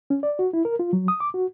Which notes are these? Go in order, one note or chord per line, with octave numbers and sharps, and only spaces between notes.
C#4
D5
F#4
E4
A#4
F4
F#3
D#6
D6
F#4